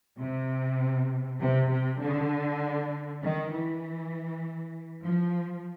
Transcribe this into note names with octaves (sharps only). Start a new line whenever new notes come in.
C3
C3
C3
D3
D#3
E3
F3